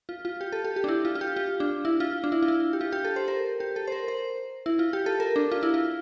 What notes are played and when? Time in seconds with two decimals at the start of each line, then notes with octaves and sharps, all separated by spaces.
0.09 F4
0.25 F4
0.41 G4
0.52 A4
0.65 G4
0.76 G4
0.84 D4
0.88 E4
1.05 F4
1.15 F4
1.21 G4
1.36 F4
1.60 D4
1.85 E4
2.00 F4
2.24 D4
2.32 E4
2.42 F4
2.48 E4
2.73 G4
2.81 F4
2.92 G4
3.05 A4
3.16 C5
3.28 A#4
3.60 G4
3.76 A4
3.87 C5
3.92 A#4
4.08 C5
4.66 E4
4.79 F4
4.93 G4
5.06 A4
5.20 A#4
5.36 D4
5.52 F4
5.63 E4
5.74 F4